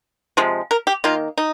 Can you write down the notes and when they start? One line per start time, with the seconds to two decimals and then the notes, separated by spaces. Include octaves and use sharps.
0.37 C3 F3 G#3
0.71 A#4
0.87 G4
1.04 D#3 A#3 F4
1.37 D#4